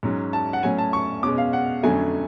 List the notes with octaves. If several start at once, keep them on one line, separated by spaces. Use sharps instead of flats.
G#2 F#3 C#4
A5
F#5
A2 F#3 C#4 G#5
A5
C#6
B2 G#3 C#4 D6
F5
F#5
F2 D3 F#3 A3 C#4 G#5